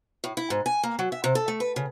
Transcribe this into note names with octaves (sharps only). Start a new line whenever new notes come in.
A2
E4
G#2
G#5
A#3
F#3
E5
C3
A4
A3
B4
C#3